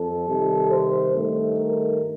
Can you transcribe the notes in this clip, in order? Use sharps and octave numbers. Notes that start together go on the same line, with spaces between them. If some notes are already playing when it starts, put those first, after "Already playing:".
Already playing: F2 A4
C3 D#3 G3
C5
G2 D#3 A3
A#4